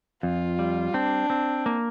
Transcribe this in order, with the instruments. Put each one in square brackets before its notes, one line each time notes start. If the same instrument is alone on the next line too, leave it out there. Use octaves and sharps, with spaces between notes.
[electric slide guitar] F2 [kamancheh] F4
[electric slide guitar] G3
[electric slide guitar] C4 [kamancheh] D4
[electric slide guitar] C4
A#3